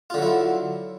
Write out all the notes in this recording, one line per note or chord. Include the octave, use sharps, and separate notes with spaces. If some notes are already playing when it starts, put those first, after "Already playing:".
D3 F#3 E4 F4